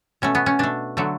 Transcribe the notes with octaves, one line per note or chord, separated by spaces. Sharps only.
B2 A3 C#4
B3
C#4
B2 A3 D4
D3 F#3 A3